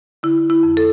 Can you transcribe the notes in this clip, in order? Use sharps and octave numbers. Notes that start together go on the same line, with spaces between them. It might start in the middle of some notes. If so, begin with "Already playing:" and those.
D3 E4
E4
F2
A4